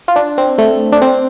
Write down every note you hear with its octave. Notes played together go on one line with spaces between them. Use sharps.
F4
D4
C4
A3
D4
C4